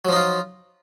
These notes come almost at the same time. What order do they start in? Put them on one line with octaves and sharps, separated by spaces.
F#3 F3 D#4 F4